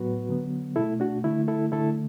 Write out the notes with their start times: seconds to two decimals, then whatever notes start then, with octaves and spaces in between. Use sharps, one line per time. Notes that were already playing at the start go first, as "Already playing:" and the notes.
Already playing: A2 F#3 B3 F#4 B4
0.29 D3 F#3 B3
0.76 B2 A3 E4 A4
1.00 D4 F#4
1.24 D3 A3 E4
1.48 E4 A4
1.72 D3 A3 E4 A4